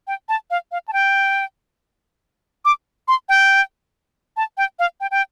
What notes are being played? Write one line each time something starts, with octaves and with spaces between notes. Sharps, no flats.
G5
A5
F5
F5
A5
G5
D6
C6
G5
A5
G5
F5
G5
G5